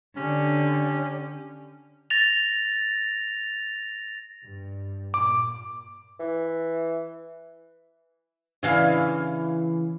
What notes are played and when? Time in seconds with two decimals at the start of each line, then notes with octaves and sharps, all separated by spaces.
0.16 D3 C#4 G4
2.10 A6 A#6 F7
4.43 G2
5.14 A#2 D6
6.19 E3
8.63 C#3 E3 F5